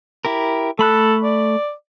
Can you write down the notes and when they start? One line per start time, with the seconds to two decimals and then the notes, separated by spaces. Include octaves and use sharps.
0.25 E4 G4 A#4
0.79 A3 A4 B5 F#6
1.24 D5